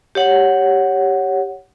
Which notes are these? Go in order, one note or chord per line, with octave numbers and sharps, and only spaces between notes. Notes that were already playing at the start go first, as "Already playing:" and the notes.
G4 C#5 F#5